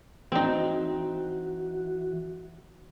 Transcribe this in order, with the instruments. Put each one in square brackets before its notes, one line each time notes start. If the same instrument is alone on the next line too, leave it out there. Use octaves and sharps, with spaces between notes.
[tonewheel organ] E3 F#4 [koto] C4 D#4